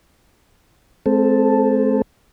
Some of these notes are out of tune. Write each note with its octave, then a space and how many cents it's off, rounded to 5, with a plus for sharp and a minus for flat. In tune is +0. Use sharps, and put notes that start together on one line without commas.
G#3 +40 C4 +0 A4 +0